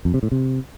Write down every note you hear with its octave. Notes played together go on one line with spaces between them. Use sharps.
F2
C3
A2
C3